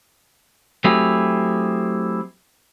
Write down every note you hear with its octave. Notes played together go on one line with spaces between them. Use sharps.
F#3 A3 C4 E4 G4 G#4